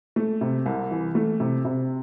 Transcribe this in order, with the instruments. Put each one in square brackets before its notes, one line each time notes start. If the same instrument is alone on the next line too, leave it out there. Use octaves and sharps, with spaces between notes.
[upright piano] A3
C3
C2
E3
A3
C3
C3